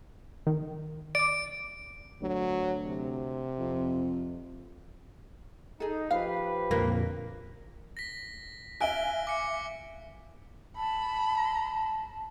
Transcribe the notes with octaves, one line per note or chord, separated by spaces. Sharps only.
D#3
D5 D6 D7
D2 F#3
C3
F2
D#4 G#4 A4
F3 G4 B4 F5
F2 A#2 D3 A#3 D4 A#4
A#6 B6
E5 F5 G#5 F#6 D7 G7
D6 C#7
A5 B5